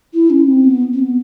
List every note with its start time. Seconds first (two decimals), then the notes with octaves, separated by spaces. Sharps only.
0.13 E4
0.30 C#4
0.47 C4
0.64 B3
0.93 C4
0.99 B3